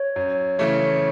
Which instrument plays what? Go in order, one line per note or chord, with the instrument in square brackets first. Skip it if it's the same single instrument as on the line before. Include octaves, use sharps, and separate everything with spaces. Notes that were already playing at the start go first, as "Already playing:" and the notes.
Already playing: [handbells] C#5
[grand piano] F#2
C#3 E3 A3 C#4